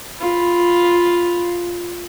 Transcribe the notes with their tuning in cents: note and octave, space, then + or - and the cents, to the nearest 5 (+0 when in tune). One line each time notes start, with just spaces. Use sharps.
F4 +0 B5 +0